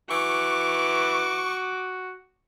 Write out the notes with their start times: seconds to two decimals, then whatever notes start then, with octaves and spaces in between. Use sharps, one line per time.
0.10 E3 F#4 C#6 D6